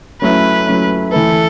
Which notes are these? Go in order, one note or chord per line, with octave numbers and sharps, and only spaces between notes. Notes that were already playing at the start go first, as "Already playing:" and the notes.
F#3 A3 C#4 E4 B4
F#3 A3 C#4 E4
E3 A3 E4 A4 B4